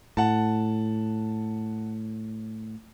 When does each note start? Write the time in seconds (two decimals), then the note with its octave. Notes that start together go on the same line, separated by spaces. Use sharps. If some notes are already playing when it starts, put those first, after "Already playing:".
0.17 A2 F#5 A5